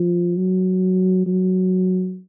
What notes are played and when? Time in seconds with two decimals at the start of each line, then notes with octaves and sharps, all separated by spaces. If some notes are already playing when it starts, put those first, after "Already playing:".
Already playing: F3
0.37 F#3
1.26 F#3